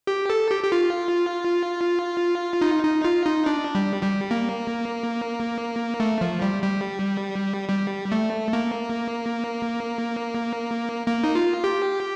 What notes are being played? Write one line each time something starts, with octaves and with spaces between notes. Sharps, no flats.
G4
A4
G4
G4
F4
D#4
D#4
F4
D#4
D4
G3
G3
A#3
A3
F3
G3
G3
G3
A3
A#3
A#3
D#4
F4
G4